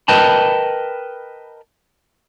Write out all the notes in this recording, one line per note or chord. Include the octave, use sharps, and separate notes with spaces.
A#4 B4 D#5 G5 A5 B5